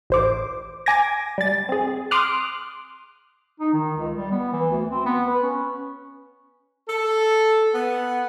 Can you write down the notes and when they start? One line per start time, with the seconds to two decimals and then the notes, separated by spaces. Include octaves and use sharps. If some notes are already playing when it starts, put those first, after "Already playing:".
0.10 A1 C5 D6
0.86 G#5 D6 G#6 A#6
1.38 G3 A6
1.69 C4 G#4
2.11 C6 D6 D#6 F6 F#6
3.60 D#4
3.73 D#3
3.97 C#2
4.16 G3
4.32 B3
4.53 E3
4.71 D2
4.90 C4
5.06 B3
5.27 B4
5.43 C#4
6.89 A4
7.75 B3